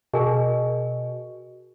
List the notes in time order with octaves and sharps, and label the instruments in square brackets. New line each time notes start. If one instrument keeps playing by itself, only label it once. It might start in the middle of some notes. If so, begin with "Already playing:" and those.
[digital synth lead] B2 [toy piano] G#4 A#4 G#5